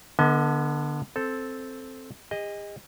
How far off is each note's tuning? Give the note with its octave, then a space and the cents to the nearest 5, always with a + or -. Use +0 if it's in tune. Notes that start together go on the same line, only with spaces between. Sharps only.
D3 +5 B3 -35 D#5 +35
C4 +0 A4 +0
G#4 -45 D#5 +0